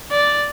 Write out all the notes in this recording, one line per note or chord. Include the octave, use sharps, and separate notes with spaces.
D5